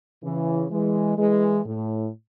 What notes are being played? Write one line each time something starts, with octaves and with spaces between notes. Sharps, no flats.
C#3 E3
E3 G#3
E3 G#3
A2